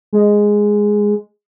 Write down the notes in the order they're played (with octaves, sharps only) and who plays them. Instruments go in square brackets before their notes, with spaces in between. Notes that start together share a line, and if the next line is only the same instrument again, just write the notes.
[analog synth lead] G#3